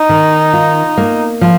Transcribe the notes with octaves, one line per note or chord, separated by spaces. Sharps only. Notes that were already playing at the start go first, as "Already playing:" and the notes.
Already playing: D#4
D#3
F4
A#3
F3